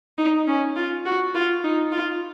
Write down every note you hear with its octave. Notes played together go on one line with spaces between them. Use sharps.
D#4
C#4
F4
F#4
F4
D#4
F4